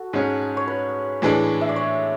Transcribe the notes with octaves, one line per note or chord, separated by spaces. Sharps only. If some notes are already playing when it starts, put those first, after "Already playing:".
Already playing: F#4 A4
G#2 G#3 C#4
C#5
B4
A2 E3 G#3 D4
E5
D5
C#5